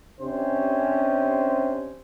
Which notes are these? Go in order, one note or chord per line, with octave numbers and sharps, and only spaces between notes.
C3 C#4 D4 C5